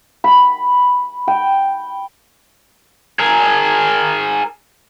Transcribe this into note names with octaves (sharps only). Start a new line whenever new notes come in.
B5
G5
G#4 A#4